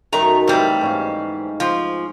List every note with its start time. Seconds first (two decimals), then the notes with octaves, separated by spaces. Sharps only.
0.12 F#2 D#3 A3 A#5
0.48 A2 C3 E3 G3 F5
0.81 G#2 C#4 F5
1.60 F3